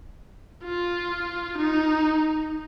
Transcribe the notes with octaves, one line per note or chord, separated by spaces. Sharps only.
F4
D#4